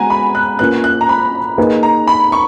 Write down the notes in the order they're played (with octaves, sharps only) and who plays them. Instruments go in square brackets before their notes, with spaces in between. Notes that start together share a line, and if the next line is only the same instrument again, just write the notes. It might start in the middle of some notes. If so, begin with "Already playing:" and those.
Already playing: [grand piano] G#3 B3 F#4 [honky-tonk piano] F#5 G#5 A#5
[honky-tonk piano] B5
F#6
[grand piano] A#3 C#4 F4 B4 [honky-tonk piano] F#6
[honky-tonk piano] F#6
A#5
B5
[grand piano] A#3 D#4 G#4 B4
[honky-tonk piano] A#5
B5
C#6